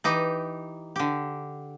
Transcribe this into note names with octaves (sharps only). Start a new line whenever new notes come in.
E3 D#4 G4
D3 G4